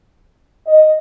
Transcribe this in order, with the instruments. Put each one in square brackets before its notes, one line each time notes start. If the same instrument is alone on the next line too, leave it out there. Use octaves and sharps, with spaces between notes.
[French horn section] D#5